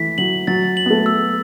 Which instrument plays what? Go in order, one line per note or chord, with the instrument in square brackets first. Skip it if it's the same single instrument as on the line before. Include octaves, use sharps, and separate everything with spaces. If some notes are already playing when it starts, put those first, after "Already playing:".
Already playing: [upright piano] E3 A3 [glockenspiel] B6
[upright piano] F#3 [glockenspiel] F#7
[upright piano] F#3 [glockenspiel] A6
[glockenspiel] F#7
[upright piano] B3
A3
[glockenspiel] E6